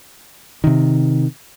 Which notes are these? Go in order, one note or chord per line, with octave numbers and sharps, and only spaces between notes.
C3 D#3